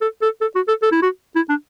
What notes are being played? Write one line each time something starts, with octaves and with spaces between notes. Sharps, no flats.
A4
A4
A4
F#4
A4
A4
E4
F#4
E4
D4